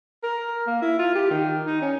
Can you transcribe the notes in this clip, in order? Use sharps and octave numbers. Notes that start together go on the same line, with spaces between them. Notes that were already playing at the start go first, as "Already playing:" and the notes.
A#4
A#3
E4
F4
G4
D#3
D#4
C#4